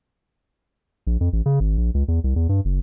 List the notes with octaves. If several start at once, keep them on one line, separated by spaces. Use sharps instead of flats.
A#1
F2
A1
C#3
G#1
A#1
C#2
E2
C2
E2
G2
F#1